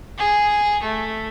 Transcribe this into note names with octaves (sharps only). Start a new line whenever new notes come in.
G#4
A3